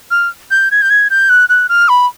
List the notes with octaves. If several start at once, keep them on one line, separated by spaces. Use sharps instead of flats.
F6
G6
G#6
G6
G#6
G6
F#6
F#6
F6
B5